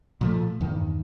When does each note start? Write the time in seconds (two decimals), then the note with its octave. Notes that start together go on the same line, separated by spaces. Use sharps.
0.21 A#2 F3 A3
0.61 E2 G2 D#3